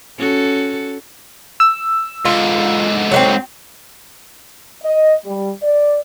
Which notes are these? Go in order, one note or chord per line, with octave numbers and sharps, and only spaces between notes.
C#4 F#4 A4
E6
G#2 D3 F4
F#3 A3 C4
D#5
G3
D5